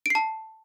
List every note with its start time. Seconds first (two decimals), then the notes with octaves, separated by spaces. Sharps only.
0.06 D7
0.10 C7
0.15 A5